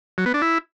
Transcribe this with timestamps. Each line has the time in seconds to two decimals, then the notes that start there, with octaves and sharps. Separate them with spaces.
0.18 F#3
0.26 B3
0.34 D4
0.42 E4